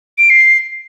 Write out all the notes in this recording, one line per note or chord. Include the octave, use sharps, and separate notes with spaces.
D7
C7